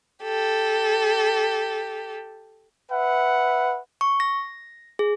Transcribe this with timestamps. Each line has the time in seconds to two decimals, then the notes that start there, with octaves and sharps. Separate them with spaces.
0.24 G4 A4
2.91 B4 E5 F#5
4.01 C#6
4.20 A#6
4.99 G#4